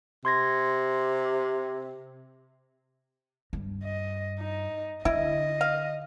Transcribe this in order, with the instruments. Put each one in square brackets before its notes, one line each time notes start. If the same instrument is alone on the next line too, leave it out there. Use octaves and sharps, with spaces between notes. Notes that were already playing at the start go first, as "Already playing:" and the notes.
[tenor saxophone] C3 [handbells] C6 G#6 A#6
[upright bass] G2
[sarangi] D#5
D#4
[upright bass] D3 [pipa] E4 [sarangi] D#5
[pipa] F5